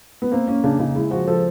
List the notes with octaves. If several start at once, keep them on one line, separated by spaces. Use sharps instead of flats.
B3
A#3 C4
A#3 C#4
C#3 D4
C#3 D#4
G#3 E4
F3 F#4
F3 A4